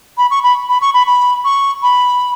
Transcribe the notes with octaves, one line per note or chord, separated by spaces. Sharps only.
B5
C#6
B5
B5
C#6
B5
B5
C#6
B5